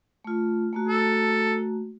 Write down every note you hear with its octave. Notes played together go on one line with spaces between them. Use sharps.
A3 F4
A3 A#3 F#4
A4